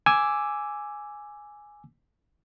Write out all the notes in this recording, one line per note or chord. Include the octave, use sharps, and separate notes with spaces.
G#5 D6 E6